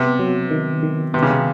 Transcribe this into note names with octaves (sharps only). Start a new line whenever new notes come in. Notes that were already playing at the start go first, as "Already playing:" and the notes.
Already playing: C3 B3
F#3
D#3
D#3
C3 B3
C#3
C3